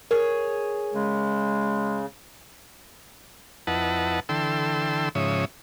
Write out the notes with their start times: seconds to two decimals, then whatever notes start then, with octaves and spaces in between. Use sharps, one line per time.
0.11 G#4 A#4 C#5
0.93 C#3 G#3
3.67 F2 E4 B4 D#5 F#5 A5
4.29 D3 E3 A4 G5 C6 E6
5.15 G#2 C#3 F3 C#5 E5 D#6